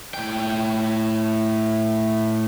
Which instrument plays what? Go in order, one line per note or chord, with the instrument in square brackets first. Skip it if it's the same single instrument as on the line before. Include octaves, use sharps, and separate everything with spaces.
[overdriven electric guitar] A2 G5